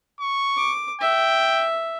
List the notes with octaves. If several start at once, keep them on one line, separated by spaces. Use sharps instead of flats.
C#6
D6
E5 G5